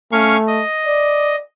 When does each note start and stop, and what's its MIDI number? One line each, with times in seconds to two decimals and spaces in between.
0.12 0.63 57
0.12 0.37 61
0.12 0.37 77
0.12 0.37 85
0.47 1.36 75
0.87 1.42 74